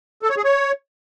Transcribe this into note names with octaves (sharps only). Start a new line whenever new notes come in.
A4
C#5
G#4
C#5